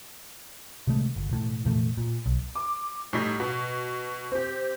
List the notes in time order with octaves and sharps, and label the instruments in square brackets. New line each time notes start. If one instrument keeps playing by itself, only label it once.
[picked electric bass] C3 D#3 G#3 A3
G1
E1 A2
F1 A#2 E3 A3
A#2
B1
[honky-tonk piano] D6
A2 G3 D#4 B6
B2
C4 G4